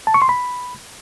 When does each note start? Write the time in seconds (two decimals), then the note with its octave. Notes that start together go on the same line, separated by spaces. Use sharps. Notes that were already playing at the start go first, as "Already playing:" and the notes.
0.07 A5
0.14 C#6
0.22 C6
0.29 B5